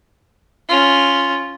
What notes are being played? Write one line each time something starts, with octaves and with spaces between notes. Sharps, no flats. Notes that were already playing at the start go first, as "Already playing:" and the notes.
C#4 F4